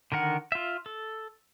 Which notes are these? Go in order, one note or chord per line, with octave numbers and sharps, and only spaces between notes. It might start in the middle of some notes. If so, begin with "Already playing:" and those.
D3 D#3 A#4 F#5
F4 E5
A4